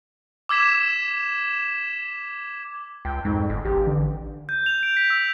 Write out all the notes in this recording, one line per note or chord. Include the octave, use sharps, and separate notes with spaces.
D6 E6 G#6 B6 E7
C#2 G5
F2 G#2
G1
A1 G4
D3
G6
F7
D7
B6
E6